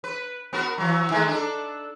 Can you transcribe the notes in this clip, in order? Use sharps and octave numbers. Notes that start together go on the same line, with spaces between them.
B4
B3 F#4 A#4
E3 F#3
D#3 G#3 A3
D4 A4